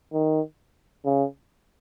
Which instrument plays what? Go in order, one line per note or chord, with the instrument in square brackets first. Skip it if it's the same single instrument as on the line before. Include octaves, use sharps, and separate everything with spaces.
[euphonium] D#3
C#3